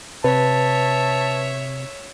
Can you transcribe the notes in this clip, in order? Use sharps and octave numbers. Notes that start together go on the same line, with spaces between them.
C3 B4 C#5 E5 A5